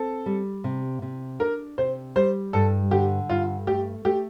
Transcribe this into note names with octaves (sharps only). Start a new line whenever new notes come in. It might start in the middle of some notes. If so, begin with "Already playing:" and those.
Already playing: C4 A4
G3
C3
C3
D4 A#4
C3 C5
G3 C5
G2 A4
D3 G4
G2 F4
A3 G4
A3 G4